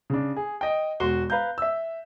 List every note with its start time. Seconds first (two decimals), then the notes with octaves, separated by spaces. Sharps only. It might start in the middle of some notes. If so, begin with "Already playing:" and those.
0.10 C#3 D4
0.36 G#4
0.61 D#5 G5
1.00 E1 F#4 C6 G7
1.30 B4 F5 A#5 G6
1.58 E5 E6